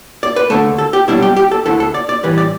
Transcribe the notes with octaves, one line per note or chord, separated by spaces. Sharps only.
D5
B4
D2 D3 A3 A4
A4
G4
B1 B2 G3 D4 E4
G4
G4
A4
D2 D3 A3 E4 A4
A4
D5
D5
A2 E3 G3 B4
D5